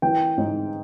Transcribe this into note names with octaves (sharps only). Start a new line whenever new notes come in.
E3 G5
G#2